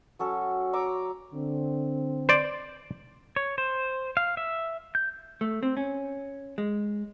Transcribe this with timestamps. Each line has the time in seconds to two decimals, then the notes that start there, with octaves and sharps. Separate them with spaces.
0.19 F#3 C#4 A4
0.73 A#5 C#6 D6 E6
1.33 D3 C4
2.29 C5 D5
3.36 C#5
3.58 C5
4.17 F5
4.37 E5
4.95 G6
5.41 A3
5.63 C4
5.77 C#4
6.58 G#3